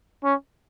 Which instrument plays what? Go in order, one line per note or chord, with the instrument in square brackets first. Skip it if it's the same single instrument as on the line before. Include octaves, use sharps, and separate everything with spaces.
[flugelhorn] C#4